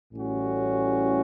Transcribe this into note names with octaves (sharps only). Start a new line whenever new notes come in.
A1 A2 G3 C#4 F#4